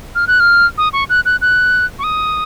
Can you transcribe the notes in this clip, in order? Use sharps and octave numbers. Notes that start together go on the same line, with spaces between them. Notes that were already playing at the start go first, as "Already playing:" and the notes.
F6
F#6
F6
D#6
C#6
F#6
F#6
F#6
C#6
D#6